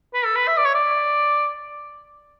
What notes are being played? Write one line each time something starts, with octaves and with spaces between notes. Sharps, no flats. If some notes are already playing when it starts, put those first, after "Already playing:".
B4
A4
B4
E5
D5
C#5
D5